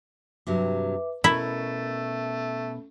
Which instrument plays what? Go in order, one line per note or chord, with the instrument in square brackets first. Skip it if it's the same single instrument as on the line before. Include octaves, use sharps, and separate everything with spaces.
[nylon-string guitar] G2 C3 F#3 [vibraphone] B4 E5 D6
[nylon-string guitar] B2 A#4 C#5 [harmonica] A3 [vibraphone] C#4 [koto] E4